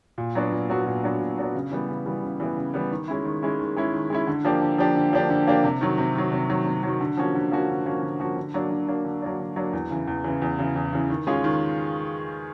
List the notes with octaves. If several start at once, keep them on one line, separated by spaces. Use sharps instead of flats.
A#2
F#3 B3 D4 F#4
A#2
F#3 B3 D4 F#4
A#2
F#3 B3 D4 F#4
A#2
F#3 B3 D4 F#4
C#3
E3 G3 B3
C#3
E3 G3 B3
C#3
E3 G3 B3
C#3
E3 G3 B3
D#3
G#3 C#4 E4
D#3
G#3 C#4 E4
D#3
G#3 C#4 E4
D#3
G#3 C#4 E4
D3
F3 A#3 D4 G4
D3
F3 A#3 D4 G4
D3
F3 A#3 D4 G4
D3
F3 A#3 D4 G4
C3
D#3 F#3
C3
D#3 F#3
C3
D#3 F#3
C3
D#3 F#3
D3
F3 A#3 C#4 F#4
D3
F3 A#3 C#4 F#4
D3
F3 A#3 C#4 F#4
D3
F3 A#3 C#4 F#4
D3
F#3 A#3 D4
D3
F#3 A#3 D4
D3
F#3 A#3 D4
D3
F#3 A#3 D4
E2
C#3 E3
E2
C#3 E3
E2
C#3 E3
E2
C#3 E3
D#3
G#3 C#4 F4 G#4
D#3